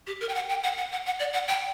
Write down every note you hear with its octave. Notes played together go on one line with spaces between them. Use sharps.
G4
A#4
G5
F#5
G5
F#5
F#5
F#5
F#5
D5
F#5
G5